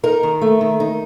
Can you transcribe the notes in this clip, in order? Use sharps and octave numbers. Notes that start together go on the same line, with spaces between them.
D#4 A#4
D#3
A3
D#3
D#4